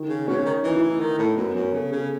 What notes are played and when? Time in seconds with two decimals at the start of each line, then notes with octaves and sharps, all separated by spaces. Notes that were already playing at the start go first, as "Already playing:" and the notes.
Already playing: D#3
0.09 C#3
0.28 B2 C#4
0.36 C#3
0.46 D#3
0.64 E3 D#4
0.76 E4
0.88 D#4
1.00 D#3
1.18 A2
1.37 F#2 B3
1.55 F#2 C#4
1.73 C#3 A4
1.92 C#3
1.97 G#4